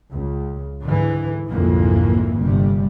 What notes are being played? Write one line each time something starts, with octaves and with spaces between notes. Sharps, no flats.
C#2
G#2 D3 E3
B1 F2 G#2 D3 E3 A#3
G1 C3 G3